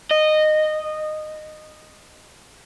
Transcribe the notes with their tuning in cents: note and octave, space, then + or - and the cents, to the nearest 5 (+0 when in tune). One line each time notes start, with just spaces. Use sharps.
D#5 -15